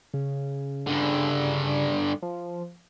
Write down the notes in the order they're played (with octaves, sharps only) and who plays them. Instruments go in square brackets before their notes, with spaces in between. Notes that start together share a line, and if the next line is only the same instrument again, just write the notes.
[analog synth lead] C#3
[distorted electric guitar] G2 D3
[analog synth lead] F3